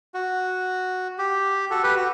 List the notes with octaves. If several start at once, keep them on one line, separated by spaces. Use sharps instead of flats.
F#4
G4
F#4 A4
G4 B4
F#4